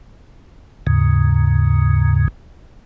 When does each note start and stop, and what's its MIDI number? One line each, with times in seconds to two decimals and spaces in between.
0.87 2.28 39
0.87 2.28 44
0.87 2.28 49